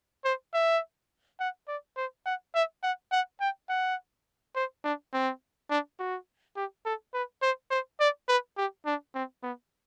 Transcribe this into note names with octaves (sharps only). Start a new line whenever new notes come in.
C5
E5
F#5
D5
C5
F#5
E5
F#5
F#5
G5
F#5
C5
D4
C4
D4
F#4
G4
A4
B4
C5
C5
D5
B4
G4
D4
C4
B3